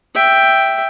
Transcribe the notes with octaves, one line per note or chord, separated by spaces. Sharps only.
E5 G5